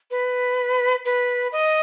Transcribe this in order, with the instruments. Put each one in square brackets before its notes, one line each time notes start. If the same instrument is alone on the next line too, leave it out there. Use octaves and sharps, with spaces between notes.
[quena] B4
B4
D#5